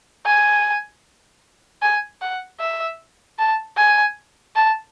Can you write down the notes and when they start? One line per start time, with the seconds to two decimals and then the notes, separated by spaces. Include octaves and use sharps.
0.26 G#5
1.82 G#5
2.21 F#5
2.60 E5
3.39 A5
3.77 G#5
4.56 A5